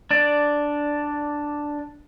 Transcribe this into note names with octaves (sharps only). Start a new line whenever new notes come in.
D4 D5